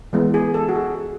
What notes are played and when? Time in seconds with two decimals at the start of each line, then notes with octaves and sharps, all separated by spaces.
0.13 E3 G#3 B3
0.34 G#4
0.54 A4
0.69 F#4
0.76 G#4